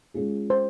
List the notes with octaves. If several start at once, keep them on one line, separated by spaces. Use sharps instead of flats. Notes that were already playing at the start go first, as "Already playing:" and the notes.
G#3 C#4 F4 G#4
C5